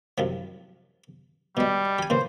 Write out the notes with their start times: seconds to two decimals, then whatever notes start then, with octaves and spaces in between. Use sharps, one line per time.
0.18 C2 F#2 F3
1.57 B2 G3 G#3
1.99 G4 G#5
2.10 A#2 C#3 E3 C5